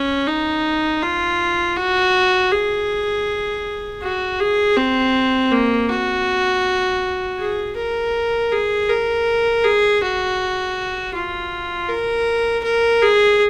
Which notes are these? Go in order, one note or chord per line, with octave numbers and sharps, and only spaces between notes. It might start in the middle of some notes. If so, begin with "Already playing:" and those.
Already playing: C#4
D#4
F4
F#4
G#4
F#4
G#4
C4
A#3
F#4
G#4
A#4
G#4
A#4
G#4
F#4
F4
A#4
A#4
G#4